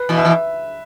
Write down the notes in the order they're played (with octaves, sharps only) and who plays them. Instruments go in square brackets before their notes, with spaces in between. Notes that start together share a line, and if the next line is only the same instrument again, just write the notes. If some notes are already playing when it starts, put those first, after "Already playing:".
Already playing: [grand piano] B4
[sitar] B2 E3
[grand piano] E5
[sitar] E3